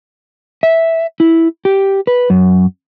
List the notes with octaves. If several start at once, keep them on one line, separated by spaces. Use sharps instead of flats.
E5
E4
G4
B4
F#2